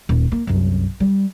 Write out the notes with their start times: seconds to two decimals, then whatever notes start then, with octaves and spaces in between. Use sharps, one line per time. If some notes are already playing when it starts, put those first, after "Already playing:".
0.09 D#1
0.32 A#3
0.47 C2 F#2
1.00 G3